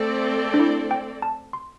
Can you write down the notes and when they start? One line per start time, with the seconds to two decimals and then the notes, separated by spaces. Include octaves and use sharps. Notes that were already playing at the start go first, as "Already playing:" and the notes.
Already playing: A3 C4 A4 D5
0.54 D4
0.59 E4
0.91 G5
1.22 A5
1.53 C6